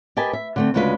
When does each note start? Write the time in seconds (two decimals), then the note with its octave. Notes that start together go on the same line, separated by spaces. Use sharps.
0.17 G4 A#4 B4 D#5 G#5 A5
0.33 E5
0.56 D3 A3 C4
0.74 D2 C#3 G#3 D4 F4 B4